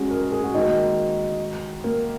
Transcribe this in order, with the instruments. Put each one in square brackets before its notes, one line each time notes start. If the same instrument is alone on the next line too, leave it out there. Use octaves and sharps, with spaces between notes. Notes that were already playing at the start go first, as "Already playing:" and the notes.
Already playing: [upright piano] G#3 [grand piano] C#4 F#4 G#4
[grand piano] A#4
A#4
G#4
F#4
[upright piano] D#3 G#3 F#4 A#4 [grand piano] D#4
[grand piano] A#3
A#3